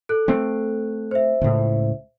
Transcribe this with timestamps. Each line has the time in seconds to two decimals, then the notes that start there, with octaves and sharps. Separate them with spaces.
0.09 A4 F#6
0.28 A3 C4
1.11 C5 E5
1.41 C#2 A2